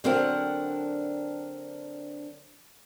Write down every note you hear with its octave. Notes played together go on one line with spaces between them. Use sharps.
D3 F#3 C4 D4 A#4 F#5